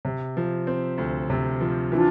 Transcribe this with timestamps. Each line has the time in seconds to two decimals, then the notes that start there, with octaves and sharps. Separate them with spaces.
0.05 C3
0.37 F3
0.67 C4
0.98 D2
1.30 C3
1.61 F3
1.92 E3 D4 F4